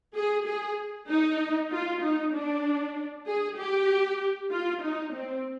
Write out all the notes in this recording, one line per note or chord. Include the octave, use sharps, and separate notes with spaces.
G#4
G#4
D#4
F4
D#4
D4
G#4
G4
F4
D#4
C4